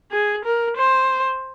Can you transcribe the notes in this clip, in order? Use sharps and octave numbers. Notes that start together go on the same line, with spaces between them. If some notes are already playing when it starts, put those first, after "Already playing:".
G#4
A#4
C5